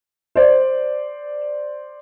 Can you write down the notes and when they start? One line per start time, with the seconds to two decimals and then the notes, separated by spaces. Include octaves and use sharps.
0.35 C5 D5